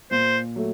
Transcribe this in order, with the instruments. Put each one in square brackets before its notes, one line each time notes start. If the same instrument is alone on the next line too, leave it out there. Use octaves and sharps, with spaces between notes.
[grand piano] A#2 [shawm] C5
[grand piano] F#3 A3